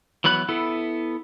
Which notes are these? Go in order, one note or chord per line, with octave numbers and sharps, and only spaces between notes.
E3 F#3 B3 B5 F#6
B3 E4 A4